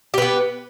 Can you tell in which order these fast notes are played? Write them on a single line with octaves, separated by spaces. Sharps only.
G4 B4 B3